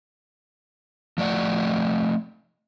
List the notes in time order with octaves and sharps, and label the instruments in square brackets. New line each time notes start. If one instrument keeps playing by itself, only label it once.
[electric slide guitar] F3 A3 D5 F#5